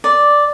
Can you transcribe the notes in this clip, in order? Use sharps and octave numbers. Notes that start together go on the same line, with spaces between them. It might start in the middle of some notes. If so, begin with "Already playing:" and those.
D5